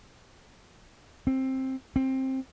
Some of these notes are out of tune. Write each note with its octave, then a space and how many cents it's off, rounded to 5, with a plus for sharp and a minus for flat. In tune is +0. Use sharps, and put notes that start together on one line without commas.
C4 +10
C4 +15